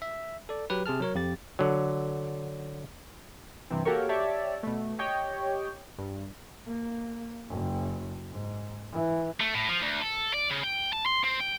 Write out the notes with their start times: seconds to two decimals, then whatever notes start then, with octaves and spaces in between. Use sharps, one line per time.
0.02 E5
0.49 A4 D5
0.70 F#3 G4 B4
0.86 C3 G#4 A5 F6
1.00 F#3 A#4 C#5
1.15 F2 G4 A6
1.59 D3 F#3
3.70 G2 C3 E3 C4
3.85 A#3 F#4 G4 A4 A#4 C#5
4.09 G4 C#5 D5 E5 A5
4.63 B2 A3
4.99 G4 C#5 D#5 G5
5.98 G2
6.67 A#3
7.50 F#1
8.30 G#2
8.93 E3
9.40 A3
9.55 A2
9.69 F3
9.82 D2
10.01 A4
10.34 D5
10.51 C#3
10.64 G5
10.93 A5
11.06 C6
11.24 C4
11.40 G5